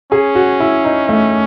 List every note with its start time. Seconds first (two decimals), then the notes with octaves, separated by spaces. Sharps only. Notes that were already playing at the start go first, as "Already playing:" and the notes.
0.12 C#4 G#4
0.35 F#4
0.60 E4
0.85 D#4
1.09 A3